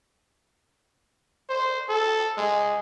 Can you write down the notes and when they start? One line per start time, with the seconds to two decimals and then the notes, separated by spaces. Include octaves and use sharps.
1.49 C5
1.89 A4
2.37 G#3